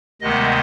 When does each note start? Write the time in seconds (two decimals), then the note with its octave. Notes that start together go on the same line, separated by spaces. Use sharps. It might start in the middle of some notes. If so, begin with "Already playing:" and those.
0.21 D2 C3 D#3 G#3 B3 D#5